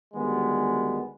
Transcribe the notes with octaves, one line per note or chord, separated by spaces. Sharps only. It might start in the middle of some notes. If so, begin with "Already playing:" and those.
D2 D#3 G3 G#3 B3